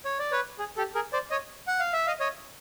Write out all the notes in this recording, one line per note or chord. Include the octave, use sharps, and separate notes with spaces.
C#5
D5
B4 C#5
G#4
G4 A4
G#4 A#4
C5 D5
C#5 D#5
F#5
F5
E5
D#5 F5
C#5 D#5